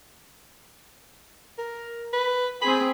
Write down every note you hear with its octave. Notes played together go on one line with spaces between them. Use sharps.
A#4
B4
C4 G#4 B5